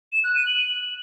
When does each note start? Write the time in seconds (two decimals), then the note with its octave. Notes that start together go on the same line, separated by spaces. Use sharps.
0.13 E7
0.24 F#6
0.35 D#7
0.47 F#7